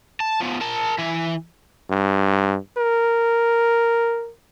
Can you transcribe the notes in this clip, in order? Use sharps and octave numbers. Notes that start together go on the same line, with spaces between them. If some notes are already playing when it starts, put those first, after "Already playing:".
A5
F3 B3
A#4 A5
E3 E5
G2
A#4